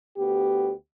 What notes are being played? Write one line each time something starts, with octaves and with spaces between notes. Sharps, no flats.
D2 B3 G4